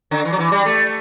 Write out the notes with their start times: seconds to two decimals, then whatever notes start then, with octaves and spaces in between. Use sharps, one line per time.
0.11 D3
0.25 E3
0.32 F#3
0.39 E3
0.52 G3
0.66 A3